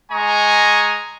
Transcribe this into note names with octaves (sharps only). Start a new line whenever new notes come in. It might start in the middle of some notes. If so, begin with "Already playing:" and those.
G#3 D#5 G#5 A#5 C#6